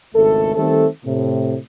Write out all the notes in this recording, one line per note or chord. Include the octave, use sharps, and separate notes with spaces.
G#1 C#2 A3 A4
D#3 G3 A3 C4 A4
A2 C3